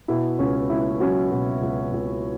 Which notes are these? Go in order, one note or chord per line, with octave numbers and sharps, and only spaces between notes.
B2 E4
C#2 C#4
C#2 E4
F#3 C#4 F#4
B2
C#2
C#2